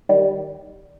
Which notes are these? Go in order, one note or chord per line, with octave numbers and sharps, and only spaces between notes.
D#3 G3